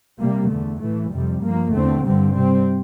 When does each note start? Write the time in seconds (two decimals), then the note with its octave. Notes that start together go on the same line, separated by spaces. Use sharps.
0.21 C3 G3 A#3
0.51 E2 D3 A3
0.82 A2 E3 A3
1.13 F2 C3 G3
1.44 G2 F3 A#3
1.74 E2 D3 A3 C4
2.04 G2 D3 G3 C4
2.35 C3 G3 C4